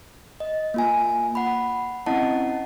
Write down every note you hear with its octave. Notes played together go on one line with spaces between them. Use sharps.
D#5
A#3 F4 G#5
F#5 B5
C4 C#4 E4 D#5 F#5 A5